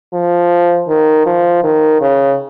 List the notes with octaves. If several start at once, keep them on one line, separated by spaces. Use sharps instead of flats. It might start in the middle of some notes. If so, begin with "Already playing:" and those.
F3
D#3
F3
D#3
C#3